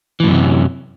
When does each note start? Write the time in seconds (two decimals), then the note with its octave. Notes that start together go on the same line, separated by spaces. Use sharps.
0.20 E3
0.24 A2
0.27 F#2
0.31 C3
0.35 F#3